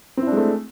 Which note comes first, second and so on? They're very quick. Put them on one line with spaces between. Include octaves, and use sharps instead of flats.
C4 E4 D4 G#3 A3